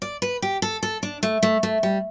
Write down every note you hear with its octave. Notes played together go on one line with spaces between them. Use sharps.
D5
B4
G4
A4
A4
D4
A3
A3
A3
G3